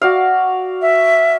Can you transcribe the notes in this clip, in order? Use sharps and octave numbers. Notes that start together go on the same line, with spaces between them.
F#4 D5 F5
E5